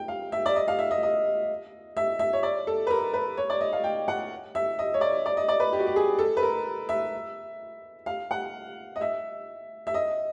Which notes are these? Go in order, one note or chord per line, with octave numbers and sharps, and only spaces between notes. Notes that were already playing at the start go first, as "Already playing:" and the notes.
Already playing: G5
F5
E5
D5
D#5
F5
E5
D#5
D#5
E5
E5
C#5
D5
A4
B4
A#4
B4
C#5
D5
D#5
F5
G5
F#5
E5
D#5
C#5
D5
D5
D#5
D5
B4
G4
F#4
G4
G#4
A4
B4
A#4
E5
F5
F#5
D#5
E5
E5
D#5